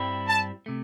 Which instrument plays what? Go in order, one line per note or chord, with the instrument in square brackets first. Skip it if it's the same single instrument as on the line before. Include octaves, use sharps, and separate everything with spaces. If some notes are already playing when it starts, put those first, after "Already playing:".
Already playing: [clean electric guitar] G2 G3 C4 E4
[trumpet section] A5
[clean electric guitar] C3 A3